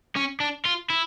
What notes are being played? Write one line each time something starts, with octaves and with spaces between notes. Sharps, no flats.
C#4
D4
F4
E4